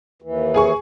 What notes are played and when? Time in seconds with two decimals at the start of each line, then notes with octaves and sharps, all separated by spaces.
0.22 D#2 E3
0.54 G#4 G#5 C#6